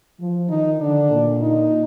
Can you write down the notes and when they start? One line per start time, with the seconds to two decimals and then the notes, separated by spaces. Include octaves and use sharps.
0.20 F3
0.50 D#3 D#4
0.80 D3 D4
1.11 A#2
1.42 D#4